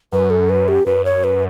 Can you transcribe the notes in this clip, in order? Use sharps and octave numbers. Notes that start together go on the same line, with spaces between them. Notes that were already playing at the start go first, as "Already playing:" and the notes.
F#2 B4
A4
B4
G4
F#2 B4
C#5
B4